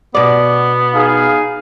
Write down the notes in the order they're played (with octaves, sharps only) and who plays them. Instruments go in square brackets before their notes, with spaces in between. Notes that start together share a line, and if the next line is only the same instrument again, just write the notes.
[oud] B2 D5 [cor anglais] B3
[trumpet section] D#4 G#4 F5